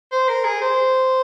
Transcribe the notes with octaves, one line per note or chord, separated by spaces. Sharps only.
C5
A#4
G#4
C5